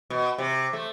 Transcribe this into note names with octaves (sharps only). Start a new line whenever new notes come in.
B2
C3
A3